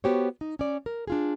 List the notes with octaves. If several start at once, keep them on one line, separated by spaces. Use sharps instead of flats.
B3 F#4 G4 C5 C#5
D#4
C#4 D5
A#4
D4 F4 G#4